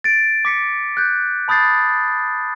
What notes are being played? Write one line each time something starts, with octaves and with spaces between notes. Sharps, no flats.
A6 D7
D6 B6 C#7
F#6 G6
A5 B5 D#6 G6 A6 C7